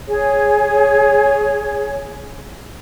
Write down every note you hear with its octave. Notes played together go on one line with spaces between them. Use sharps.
G#4 C#5